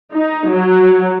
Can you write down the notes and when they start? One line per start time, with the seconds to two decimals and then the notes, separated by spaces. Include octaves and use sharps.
0.12 D#4
0.49 F#3